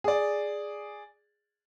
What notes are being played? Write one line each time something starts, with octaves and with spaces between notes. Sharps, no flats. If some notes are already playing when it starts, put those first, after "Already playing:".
G#4 D5